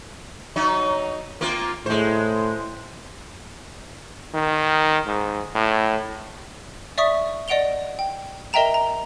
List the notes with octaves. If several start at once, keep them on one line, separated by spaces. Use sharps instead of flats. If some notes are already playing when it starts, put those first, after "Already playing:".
F#3 D#4
A#3 C4 F4
A2 G#3 C5
D#3
G#2
A2
D5 E5 C#6 D#6 B6
D5 D#5 F#5 D7 F7 G7
G5
A#4 D#5 E5 G5 A#5 E7
A#5